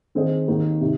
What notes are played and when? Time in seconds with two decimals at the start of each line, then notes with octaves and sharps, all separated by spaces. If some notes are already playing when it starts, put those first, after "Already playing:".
0.15 D#3 C4 G#4 C5 D#5
0.48 D#2 D#3 A#3 D#4
0.81 C3